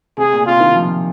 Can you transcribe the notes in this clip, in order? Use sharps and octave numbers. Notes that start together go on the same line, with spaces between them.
C3 G#4
A#2
C3 F4
D#3
F3